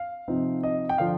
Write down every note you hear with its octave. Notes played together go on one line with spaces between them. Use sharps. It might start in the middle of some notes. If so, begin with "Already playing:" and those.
Already playing: F5
C3 F3 C4 D#4
D#5
G5
D3 F3 F5